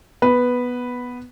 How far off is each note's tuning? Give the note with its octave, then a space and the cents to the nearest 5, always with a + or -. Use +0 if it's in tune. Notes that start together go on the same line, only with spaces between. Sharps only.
B3 -5 B4 +0